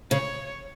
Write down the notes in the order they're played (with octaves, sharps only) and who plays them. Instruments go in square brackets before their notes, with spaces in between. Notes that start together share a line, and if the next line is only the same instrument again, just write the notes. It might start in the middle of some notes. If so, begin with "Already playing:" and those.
[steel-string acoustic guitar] C#3 [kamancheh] C#5